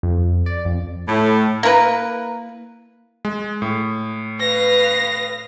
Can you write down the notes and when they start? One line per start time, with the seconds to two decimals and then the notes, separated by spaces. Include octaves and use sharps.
0.03 F2
0.46 D5
0.65 F2
1.08 A2
1.63 A#3 E4 A#4 B4
3.25 G#3
3.62 A2
4.40 B4 F5 A#6